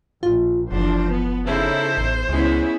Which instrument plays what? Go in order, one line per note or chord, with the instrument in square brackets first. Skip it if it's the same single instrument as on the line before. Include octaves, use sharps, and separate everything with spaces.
[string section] A#1 [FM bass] F4
[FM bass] F#1 [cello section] E3 D4 C5 [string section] F3
[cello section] B3
[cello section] C#3 D#4 A4 [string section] E4 [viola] C5
[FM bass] A1 [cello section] E2
[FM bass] C#2 [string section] G#3 [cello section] B3 C#4 E4